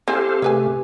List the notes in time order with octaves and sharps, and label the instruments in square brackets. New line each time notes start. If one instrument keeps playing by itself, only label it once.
[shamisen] C4 E4 G#5 [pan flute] G4 [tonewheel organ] A4 C5 F5
[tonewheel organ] C3 A3 [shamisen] G#4 B4 G#5